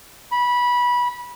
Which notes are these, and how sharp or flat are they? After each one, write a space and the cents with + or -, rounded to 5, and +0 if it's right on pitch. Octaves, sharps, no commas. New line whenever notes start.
B5 -20